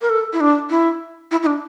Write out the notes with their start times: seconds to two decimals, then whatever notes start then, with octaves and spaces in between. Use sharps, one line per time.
0.02 A#4
0.10 A4
0.33 E4
0.40 D4
0.70 E4
1.31 E4
1.43 E4
1.46 D4